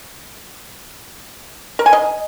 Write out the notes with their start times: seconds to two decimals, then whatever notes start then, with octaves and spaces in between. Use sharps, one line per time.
1.79 A#4
1.86 G#5
1.93 D#5